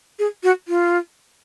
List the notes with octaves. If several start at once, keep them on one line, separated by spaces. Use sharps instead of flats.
G#4
F#4
F4